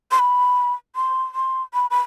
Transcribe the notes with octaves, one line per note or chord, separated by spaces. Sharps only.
C6
B5
C6
C6
B5
B5